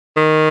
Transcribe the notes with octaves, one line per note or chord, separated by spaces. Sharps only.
D#3